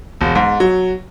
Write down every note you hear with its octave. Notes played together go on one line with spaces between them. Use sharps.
E1
G#2
F#3